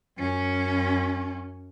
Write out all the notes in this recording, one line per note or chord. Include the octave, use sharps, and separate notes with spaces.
F#2 C#4